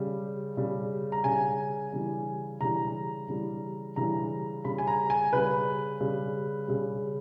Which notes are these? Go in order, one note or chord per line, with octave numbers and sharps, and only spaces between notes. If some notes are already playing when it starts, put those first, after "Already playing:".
Already playing: C#3 G3
C#3 G3
A#5
C#3 G3 G#5
C#3 E3 G3
C#3 E3 G3 A#5
C#3 E3 G3
C#3 E3 G3 A#5
C#3 G3 B5
G#5
A#5
G#5
C#3 G3 B4
C#3 G3
C#3 G3